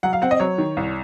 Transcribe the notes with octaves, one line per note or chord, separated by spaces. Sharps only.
F#3 F#5
F5
C4 F#5
D#5
F#3 C#5
D#3
C2